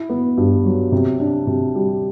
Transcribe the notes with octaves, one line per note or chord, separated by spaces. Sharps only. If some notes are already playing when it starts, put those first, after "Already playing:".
Already playing: E4
B3
G2
F#3
C3
D4
C3
G3